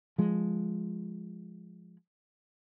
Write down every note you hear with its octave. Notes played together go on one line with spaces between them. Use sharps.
F3 G#3